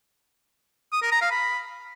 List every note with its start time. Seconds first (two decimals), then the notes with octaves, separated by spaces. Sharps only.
0.92 D#6
1.02 A#4
1.12 A#5
1.21 F5
1.31 B5